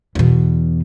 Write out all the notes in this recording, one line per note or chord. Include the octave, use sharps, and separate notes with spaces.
E2 B2